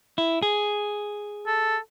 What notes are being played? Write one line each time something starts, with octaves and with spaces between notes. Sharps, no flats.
E4
G#4
A4